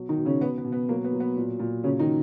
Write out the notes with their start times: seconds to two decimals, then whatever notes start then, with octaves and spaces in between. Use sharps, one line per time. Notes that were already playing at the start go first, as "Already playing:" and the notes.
Already playing: B2 F#3
0.09 D#3 D#4
0.17 B2
0.25 C#3 C#4
0.41 B2 B3
0.58 B3
0.65 B2
0.72 B3
0.89 F#3 A#3
1.04 B3
1.13 F#3
1.20 B3
1.37 A#2
1.59 A#2
1.83 C#3 F#3 C#4
1.99 D#3 D#4